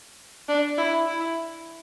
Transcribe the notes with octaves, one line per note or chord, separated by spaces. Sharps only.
D4
E4
E4